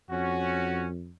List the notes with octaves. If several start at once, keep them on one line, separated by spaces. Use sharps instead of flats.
F2 C#4 F#4